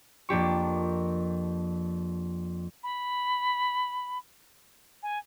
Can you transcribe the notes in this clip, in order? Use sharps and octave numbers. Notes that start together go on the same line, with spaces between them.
F2 A#3 D4 G4 C#6
B5
G#5